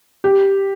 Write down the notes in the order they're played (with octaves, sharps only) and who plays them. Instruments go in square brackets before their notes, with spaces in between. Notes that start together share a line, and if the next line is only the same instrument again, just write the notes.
[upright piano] G4